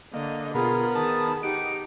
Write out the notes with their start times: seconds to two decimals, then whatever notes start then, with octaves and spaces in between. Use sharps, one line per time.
0.14 D3 A#3 D#5
0.54 B2 B3 F4 G#4 A#4 B5
0.95 D#3 G#4 A5 D#6
1.43 D#4 G4 F#5 D7